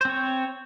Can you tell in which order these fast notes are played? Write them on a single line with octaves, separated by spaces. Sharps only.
C5 C4 C#5